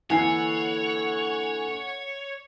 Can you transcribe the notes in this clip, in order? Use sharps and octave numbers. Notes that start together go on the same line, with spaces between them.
D3 E3 A#3 C#5 F#5 G#5 C7